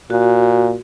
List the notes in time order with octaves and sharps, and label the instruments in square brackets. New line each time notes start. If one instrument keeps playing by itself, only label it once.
[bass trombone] A#2 [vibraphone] F#4